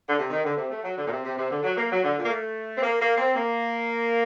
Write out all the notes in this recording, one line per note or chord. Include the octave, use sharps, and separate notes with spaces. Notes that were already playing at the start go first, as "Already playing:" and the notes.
D3
C3
D#3
D3
C3
A3
F#3
D3
A#2
C3
C3
C3
D3
F#3
A#3
F#3
D3
A#2
A#3
A3
C4
A#3
A#3
C4
A#3